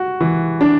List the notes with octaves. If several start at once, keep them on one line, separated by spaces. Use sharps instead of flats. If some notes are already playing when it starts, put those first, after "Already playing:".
Already playing: F#4
E3
D4